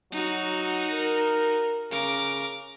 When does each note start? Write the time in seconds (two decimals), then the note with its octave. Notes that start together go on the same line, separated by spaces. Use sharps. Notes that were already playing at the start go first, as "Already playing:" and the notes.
0.12 F#3 D#4 F#4
0.91 A#4
1.91 C#3 A#4 D6